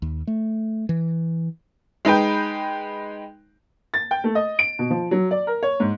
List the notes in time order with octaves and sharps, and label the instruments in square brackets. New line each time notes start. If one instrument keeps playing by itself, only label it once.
[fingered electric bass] D#2
A3
E3
[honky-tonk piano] G#3 D#4 B4 G5
[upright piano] A6
G5
A3
D#5
D7
B2
F3
F#3
D5
A#4
C#5
G#2